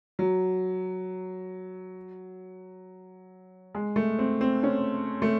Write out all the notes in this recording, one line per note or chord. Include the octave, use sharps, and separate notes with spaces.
F#3
G#3
A3
C4
C4
C#4
A3